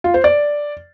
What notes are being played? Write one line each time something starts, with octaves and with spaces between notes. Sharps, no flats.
F4
C5
D5